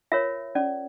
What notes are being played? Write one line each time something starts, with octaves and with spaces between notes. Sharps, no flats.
F4 A#4 C#5 E5
C#4 D5